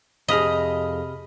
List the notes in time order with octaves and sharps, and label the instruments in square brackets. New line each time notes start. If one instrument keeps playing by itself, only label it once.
[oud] F2 G#4 [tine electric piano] C3 B5 F6 [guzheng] D#5